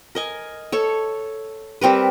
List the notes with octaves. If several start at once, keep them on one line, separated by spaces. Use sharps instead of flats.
A#4 D#5 G#5
A4 C#5
G3 C4 A#4 B4